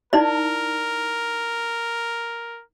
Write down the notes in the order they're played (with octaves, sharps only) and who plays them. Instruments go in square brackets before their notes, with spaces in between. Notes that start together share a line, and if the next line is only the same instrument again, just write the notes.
[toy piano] D#4 E4 D5 [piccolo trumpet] A#4